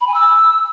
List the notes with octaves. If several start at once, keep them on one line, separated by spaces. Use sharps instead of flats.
B5
G#5
E6